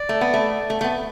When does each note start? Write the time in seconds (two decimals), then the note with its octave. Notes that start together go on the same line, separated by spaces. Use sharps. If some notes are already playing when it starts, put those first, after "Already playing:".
Already playing: D5
0.09 A3
0.21 B3
0.34 A3
0.70 A3
0.81 A3
0.84 B3